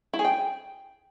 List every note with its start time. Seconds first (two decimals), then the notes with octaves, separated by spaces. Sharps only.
0.13 E4
0.19 G#4
0.25 G5